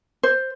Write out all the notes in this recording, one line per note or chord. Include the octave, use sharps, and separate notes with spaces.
C5